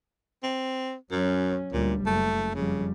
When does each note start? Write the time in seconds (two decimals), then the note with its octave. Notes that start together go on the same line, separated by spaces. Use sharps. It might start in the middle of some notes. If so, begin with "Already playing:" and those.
0.43 C4
1.11 F#2 F#3 C#4
1.73 D2 A#2 G3
2.06 F#1 A3
2.55 F2 C#3 G3